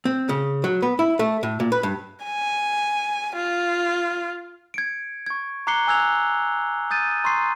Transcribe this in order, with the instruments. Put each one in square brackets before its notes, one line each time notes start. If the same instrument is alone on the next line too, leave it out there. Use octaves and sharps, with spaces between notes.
[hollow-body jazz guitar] C4
C#3
F#3
B3
E4
A3
A2
A#2
B4
G2
[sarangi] G#5
F4
[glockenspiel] G#6 C#7 D7
C#6 G#6
A#5 D6 F#6 C7 C#7 G7
G#5 E6 F#6 G#6 F7
D#6 G6 A6 D#7
A#5 C6 C#6 C7